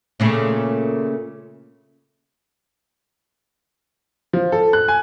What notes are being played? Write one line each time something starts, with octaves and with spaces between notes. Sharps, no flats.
A#2 C#3 A3
F3
A4
F#6
G#5